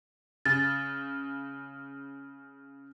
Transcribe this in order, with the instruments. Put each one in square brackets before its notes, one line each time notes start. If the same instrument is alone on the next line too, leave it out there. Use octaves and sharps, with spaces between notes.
[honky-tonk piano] C#3 [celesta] A6